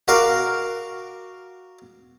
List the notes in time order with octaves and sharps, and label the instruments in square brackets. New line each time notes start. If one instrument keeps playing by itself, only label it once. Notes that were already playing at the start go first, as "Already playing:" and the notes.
[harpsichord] F#4 A#4 F5 D6